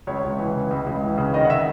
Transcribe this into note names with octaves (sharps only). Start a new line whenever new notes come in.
C#2 C#5
C#2
E3
C#3
C#2
C#2
E3
C#3
D#3 D#5
F#5
E5